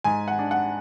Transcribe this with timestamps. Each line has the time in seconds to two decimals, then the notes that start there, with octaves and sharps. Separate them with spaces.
0.04 G#2 G#5
0.28 F#5
0.39 D4
0.51 F#5